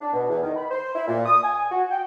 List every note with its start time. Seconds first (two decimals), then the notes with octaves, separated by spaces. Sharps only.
0.01 D4
0.13 B2
0.29 E2
0.43 D#3
0.56 B5
0.70 C5
0.96 E4
1.07 A#2
1.26 D#6
1.43 G#5
1.71 F#4
1.91 G5